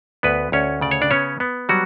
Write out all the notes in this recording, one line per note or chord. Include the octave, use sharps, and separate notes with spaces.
D2 B3 B4
D2 C#4 C#5
C#3 D5
C#5
D4 D5
B3 C#4 C#5
B3
F#3 G3 F#4